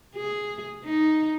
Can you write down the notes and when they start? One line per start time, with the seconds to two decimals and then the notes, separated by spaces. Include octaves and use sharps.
0.15 G#4
0.85 D#4